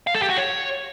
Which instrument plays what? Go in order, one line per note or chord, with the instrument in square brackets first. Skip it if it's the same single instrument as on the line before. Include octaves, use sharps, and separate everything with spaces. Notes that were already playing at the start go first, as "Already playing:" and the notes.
[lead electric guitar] F5
A4
G4
F#4
C#5